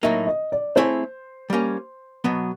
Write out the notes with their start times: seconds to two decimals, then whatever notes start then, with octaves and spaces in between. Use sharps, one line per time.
0.03 A2 F#3 A#3 D#4 E5
0.27 D#5
0.52 D5
0.76 A3 C4 E4 G#4 C5 C#5
1.50 G3 A#3 C#4
2.24 B2 F#3 B3